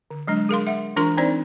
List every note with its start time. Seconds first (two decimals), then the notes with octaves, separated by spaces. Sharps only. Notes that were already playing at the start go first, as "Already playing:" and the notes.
0.10 D3
0.27 F#3 G#3 D4
0.49 G#4 A#4 F5 C6
0.67 E5 F#5
0.96 E3 D4 F4 A#4 A#5 C6
1.17 C4 D#4 C5 D5